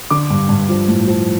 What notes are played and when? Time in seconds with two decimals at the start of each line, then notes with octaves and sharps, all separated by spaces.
0.10 D3 D6
0.30 G2
0.49 G2
0.69 F3
0.88 A2
1.07 F3